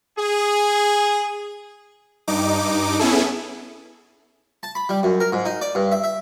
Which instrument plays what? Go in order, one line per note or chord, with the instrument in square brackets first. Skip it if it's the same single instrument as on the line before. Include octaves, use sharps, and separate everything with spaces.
[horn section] G#4
[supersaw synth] G2 D#4 D6
B3 C#4 E4 G#4 A4
[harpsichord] A5
B5
G3
F#2
A#4
G#2
D#4
D5
G2
E5
E5